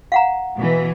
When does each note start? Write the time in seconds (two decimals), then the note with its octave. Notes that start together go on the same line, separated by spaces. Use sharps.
0.12 F5 F#5 A#5
0.57 B2 E3